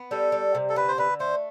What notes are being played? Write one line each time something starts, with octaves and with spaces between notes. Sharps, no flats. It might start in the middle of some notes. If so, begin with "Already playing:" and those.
Already playing: B3
G3 A4
G3
C3
A4
D3 B4
C5
D3 B4
A3 C5